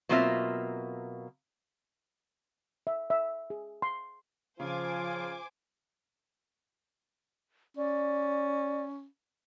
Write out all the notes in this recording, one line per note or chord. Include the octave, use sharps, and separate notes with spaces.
B2 F#3 A#3 C4 F4 E5
E5
E5
G#4
C6
C#3 F3 F4 C5 G#5 D6
C#4 D5